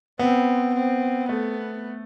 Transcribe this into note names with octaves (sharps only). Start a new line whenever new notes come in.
B3 C4
C4
A3 B3